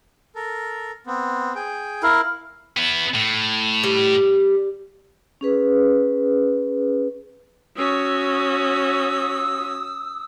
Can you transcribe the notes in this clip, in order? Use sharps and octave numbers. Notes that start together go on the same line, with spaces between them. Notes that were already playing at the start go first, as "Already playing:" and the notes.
A4 A#4
B3 C4
G#4 G5
E4 A#4 F5
B3 E4
A2
G3
C#4 G#4 B4
C#4 F#4 D#6 E6